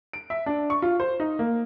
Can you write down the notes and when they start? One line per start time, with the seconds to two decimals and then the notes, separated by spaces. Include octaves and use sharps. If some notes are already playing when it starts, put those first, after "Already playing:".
0.13 D7
0.30 E5
0.46 D4
0.70 C#6
0.82 F4
1.00 C5
1.20 D#4
1.39 A#3